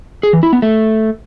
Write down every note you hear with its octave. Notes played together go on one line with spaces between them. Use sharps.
G#4
E3
E4
B3
A3